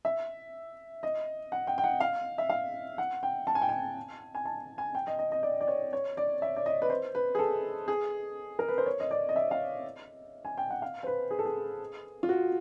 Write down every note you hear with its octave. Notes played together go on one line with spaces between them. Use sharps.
E5
D#5
F#5
G5
G5
F#5
F5
E5
F5
F#5
G5
A5
G#5
G5
G#5
G#5
A5
G#5
G5
D#5
D#5
D#5
D5
D5
C#5
C#5
D5
E5
D5
D#5
B4
C5
B4
G#4
A4
G#4
A#4
B4
C5
C#5
D#5
D5
D#5
E5
F5
G#5
G5
F#5
F5
C5
B4
G#4
A4
G#4
F4
F#4